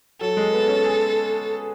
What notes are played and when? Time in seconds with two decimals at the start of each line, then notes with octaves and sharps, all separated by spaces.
0.21 F#3 A4
0.37 G#3
0.53 B3
0.68 C#4
0.84 G#4